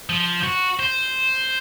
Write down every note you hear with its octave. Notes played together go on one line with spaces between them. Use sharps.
F3
F#4
C5